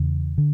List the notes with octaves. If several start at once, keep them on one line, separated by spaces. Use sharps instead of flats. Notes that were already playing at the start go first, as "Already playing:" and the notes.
Already playing: E2 C#3
D3